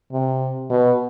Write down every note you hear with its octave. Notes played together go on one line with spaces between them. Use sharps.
C3
B2